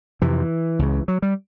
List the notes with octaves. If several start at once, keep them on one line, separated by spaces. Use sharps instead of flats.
F2 C3 E3
C#2 C#3
F#3
G3